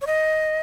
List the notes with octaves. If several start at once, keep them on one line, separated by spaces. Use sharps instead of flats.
C#5
D#5